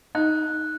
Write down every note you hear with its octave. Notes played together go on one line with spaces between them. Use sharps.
D#4 F#6